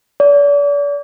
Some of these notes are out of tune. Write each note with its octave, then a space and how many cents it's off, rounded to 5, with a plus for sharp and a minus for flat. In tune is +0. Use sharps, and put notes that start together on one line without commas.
D5 -40